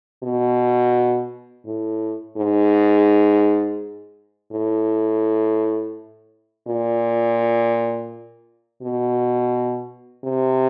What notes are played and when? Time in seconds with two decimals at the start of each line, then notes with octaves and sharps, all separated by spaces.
0.23 B2
1.66 A2
2.37 G#2
4.52 A2
6.67 A#2
8.82 B2
10.24 C3